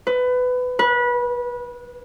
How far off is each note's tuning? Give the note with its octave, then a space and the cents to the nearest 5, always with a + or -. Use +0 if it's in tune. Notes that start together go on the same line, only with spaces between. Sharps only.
B4 +20
B4 -25